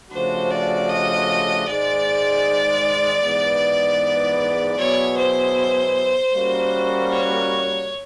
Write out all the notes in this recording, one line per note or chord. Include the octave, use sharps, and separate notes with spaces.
C#3 F3 A3 D4 F#4 C5
D5
D#5
G#2 D#3 G#3 D5
G#2 E3 G#3 B3
B2 F#3 B3 E4 G#4 C#5
C5
G3 A#3 C#4 F#4 A#4
C#5